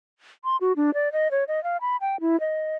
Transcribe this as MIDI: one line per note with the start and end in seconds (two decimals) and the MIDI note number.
0.44 0.57 84
0.61 0.73 66
0.76 0.94 62
0.94 1.12 74
1.12 1.30 75
1.31 1.44 73
1.48 1.62 75
1.64 1.77 77
1.81 1.97 83
2.01 2.20 79
2.20 2.39 64
2.40 2.77 75